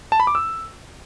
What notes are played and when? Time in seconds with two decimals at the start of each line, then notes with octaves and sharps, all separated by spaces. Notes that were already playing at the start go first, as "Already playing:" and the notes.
0.12 A5
0.20 B5
0.27 D6
0.35 E6